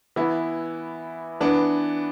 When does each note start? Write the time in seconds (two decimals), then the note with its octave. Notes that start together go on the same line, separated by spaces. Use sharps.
0.16 E3 B3 E4
1.40 E3 B3 D4